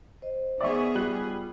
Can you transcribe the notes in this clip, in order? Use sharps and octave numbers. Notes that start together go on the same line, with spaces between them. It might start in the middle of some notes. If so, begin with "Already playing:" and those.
C5 D#5
D#3 B3 G#4 D5 E5 C#6
G3 F4 F#6